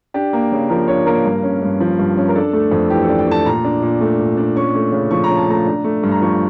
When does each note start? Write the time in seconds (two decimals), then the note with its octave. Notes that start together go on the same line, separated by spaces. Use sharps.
0.14 D4 G4
0.33 A#3
0.52 C#3
0.70 F3 A#4
0.88 D4 C#5
1.06 A#3 A#4
1.24 G2 A#4
1.43 C#4
1.62 G2
1.80 F3
1.99 G2
2.17 C#4
2.29 A#4
2.35 D4 A4
2.53 A3
2.72 F2
2.90 E3 G4
3.04 A4
3.10 D4
3.19 G5
3.27 A3 A5
3.45 A#2 A#5
3.65 D4
3.82 A#2
4.01 A3
4.19 A#2
4.37 D4
4.56 C#4 C#6
4.75 A3
4.92 C#3
5.11 F3 C#6
5.24 A#5
5.29 C#4
5.37 A5
5.49 A3 A#5
5.67 D4
5.84 A3
6.03 G2
6.12 A#5
6.22 F3 C#6